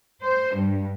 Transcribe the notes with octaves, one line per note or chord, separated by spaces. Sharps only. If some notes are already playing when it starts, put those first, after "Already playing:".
C5
G2